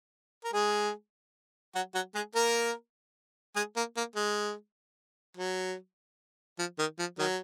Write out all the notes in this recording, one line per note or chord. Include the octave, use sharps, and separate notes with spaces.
A#4
G#3 G#4
F#3 F#4
F#3 F#4
G#3 G#4
A#3 A#4
G#3 G#4
A#3
A#3
G#3
F#3
F3
D#3
F3
D#3 F#3